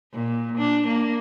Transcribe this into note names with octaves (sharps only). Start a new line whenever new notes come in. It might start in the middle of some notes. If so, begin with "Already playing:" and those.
A#2
D4
A#3